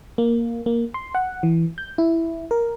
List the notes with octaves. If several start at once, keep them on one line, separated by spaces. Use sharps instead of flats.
A#3
A#3
C6
F#5
E3
G6
E4
A#4